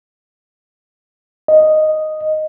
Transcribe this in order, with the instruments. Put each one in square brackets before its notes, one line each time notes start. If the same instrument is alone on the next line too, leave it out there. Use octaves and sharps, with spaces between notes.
[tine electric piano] D#5